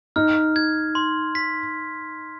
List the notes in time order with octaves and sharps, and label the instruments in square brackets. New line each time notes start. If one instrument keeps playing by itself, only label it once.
[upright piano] D#4 [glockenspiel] F6
[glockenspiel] G#6
C6
B6